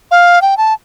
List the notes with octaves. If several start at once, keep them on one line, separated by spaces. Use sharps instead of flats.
F5
G5
A5